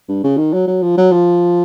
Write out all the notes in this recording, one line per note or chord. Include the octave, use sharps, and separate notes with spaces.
G2
C#3
D#3
F#3
F#3
F3
F#3
F3